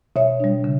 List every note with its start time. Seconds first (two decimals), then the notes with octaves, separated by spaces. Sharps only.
0.16 B2 C#5 E5
0.40 G3 D4
0.64 C#3